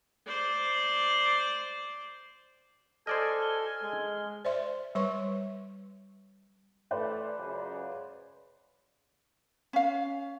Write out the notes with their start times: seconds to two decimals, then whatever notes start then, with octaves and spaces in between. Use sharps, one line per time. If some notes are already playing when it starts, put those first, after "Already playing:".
0.26 C5 D5
3.07 A4 C5 D5 D#5 G#5 F6
3.42 G7
3.82 G#3
4.45 C5 D5 E5 C6
4.95 G3 B4 C#5 C6 C#6
6.91 E3 A3 B4 C5 D5
7.38 C#2 F#2 C#3
9.73 C#4 F5